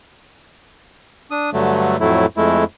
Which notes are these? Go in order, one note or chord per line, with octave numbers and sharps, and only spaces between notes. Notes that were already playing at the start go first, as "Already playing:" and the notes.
D4 D#6
G2 D3 F#3 A3
F2 A2 F#3 A3 E4
F2 G#3 A3 E4